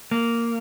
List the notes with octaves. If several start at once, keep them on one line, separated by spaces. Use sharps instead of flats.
A#3